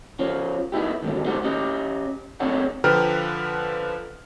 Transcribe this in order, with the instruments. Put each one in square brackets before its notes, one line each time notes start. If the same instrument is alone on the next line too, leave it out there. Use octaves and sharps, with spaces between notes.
[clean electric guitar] F3 C#4
B3 D#4 E4 G4
D#2 G#2 B2 D3
C#2 D#4 G4 C5 F#5
C#4 G4 D#5
C4 D4 D#4 G#4 C#5 F#5
[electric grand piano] D3 F3 B4 G5 A#5 F6